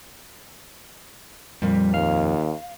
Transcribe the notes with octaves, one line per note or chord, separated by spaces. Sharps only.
F2 A#2 G3 A#3
D#2 F5